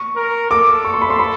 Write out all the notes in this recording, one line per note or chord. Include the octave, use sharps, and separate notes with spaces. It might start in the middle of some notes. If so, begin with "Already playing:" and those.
Already playing: C#6
A#4
A4 D6
C#6
C6
B5
C6
B5